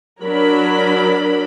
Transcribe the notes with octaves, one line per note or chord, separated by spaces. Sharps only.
F#3 D4 A#4 B5